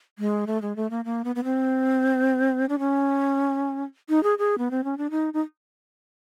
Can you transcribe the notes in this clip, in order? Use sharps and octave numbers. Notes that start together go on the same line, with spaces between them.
G#3
A3
G#3
A3
A#3
A#3
B3
B3
C4
D4
C#4
D#4
G#4
G#4
B3
C4
C#4
D4
D#4
D#4